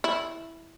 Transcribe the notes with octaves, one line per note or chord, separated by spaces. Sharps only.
E4